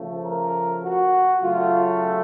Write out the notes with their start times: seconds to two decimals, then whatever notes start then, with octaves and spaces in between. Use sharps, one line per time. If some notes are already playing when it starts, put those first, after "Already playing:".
Already playing: C#3 F3 A3
0.22 A#4
0.82 F#4
1.41 C#3 F#3 A3 F4